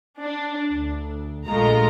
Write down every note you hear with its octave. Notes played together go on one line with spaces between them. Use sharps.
D4
D2
A#1 G#3 A3 F4 A#5